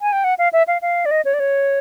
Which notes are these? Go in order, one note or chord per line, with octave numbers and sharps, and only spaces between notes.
G#5
G5
F#5
F5
E5
F5
F5
D5
D#5
C#5
D5
C#5